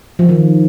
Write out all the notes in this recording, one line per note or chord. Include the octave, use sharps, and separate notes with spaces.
F3
D#3